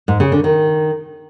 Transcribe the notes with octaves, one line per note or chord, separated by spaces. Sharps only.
G#2
C#3
D3
D#3